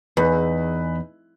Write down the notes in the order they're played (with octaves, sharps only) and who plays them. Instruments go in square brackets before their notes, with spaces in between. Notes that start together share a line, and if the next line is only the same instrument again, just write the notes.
[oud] E2 [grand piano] D#4 G#4 B4